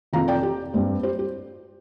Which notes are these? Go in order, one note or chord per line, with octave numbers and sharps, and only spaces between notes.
F1 F2 F3 F5 A#5
D5 G5
G4
G2 G3 C4
G4 C5
G4